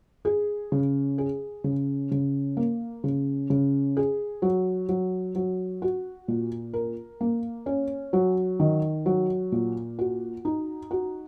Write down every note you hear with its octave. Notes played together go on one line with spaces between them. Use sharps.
G#4
C#3
G#4
C#3
C#3
A#3
C#3
C#3
G#4
F#3
F#3
F#3
F#4
A#2
A#4
A#3
C#4
F#3
D#3
F#3
A#2
F#4
D#4
F#4